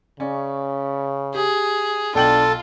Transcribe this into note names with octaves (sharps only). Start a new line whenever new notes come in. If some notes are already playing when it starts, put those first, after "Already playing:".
C#3 C#4 D5
G4 G#4
B1 D4 F4 A4 G5 F#7